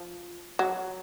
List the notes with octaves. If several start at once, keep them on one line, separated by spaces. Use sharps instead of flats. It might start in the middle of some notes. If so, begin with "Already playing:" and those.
Already playing: F3
F#3